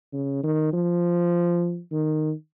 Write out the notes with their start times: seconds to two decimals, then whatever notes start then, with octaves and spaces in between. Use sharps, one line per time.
0.13 C#3
0.43 D#3
0.73 F3
1.92 D#3